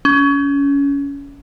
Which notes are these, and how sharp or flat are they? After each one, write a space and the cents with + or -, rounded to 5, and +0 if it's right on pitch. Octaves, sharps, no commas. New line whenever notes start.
C#4 +25